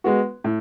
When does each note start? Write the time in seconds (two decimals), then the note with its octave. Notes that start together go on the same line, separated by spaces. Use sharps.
0.04 G#3 B3 F#4
0.44 A2